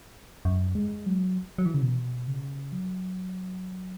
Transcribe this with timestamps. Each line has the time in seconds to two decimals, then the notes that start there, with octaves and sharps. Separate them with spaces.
0.45 F#2
0.75 G#3
1.06 F#3
1.58 F#3
1.66 E3
1.74 C#3
1.82 B2
2.28 C#3
2.72 F#3